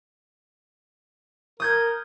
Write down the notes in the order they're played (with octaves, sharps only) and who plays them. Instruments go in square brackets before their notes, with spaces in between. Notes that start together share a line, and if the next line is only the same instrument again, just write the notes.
[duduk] A#4 [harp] D#6 G6 G#6